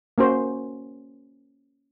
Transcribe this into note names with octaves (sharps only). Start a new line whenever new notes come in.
A#3 C#4 F#4 C5